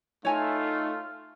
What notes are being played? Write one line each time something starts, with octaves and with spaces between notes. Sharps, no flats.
A3 D#4 F4 C#5 G#5 A#5